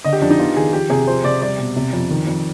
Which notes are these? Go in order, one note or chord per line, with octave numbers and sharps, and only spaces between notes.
D3 D#5
G4
F2 D4
D#4
B3 F4
D#3 G#4
F3 G4
C3 G#4
F3 C5
C3 D5
G3 D5
B2
C3
F2
D#3
F2